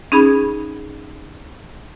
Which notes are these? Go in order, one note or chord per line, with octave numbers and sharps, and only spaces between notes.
C#4 D#4 G#4 B5 G#6